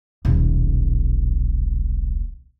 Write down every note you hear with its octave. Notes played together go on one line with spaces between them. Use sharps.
D#1 B1